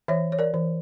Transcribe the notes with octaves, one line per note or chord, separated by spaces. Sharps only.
E3 C#5 E5
C#5
A#4 D5
E3